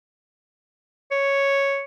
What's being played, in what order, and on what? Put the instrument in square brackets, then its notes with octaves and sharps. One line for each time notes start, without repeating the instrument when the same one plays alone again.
[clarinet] C#5